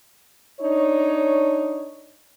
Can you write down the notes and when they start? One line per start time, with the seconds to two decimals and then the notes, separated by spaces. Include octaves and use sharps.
0.61 D4 D#4 C#5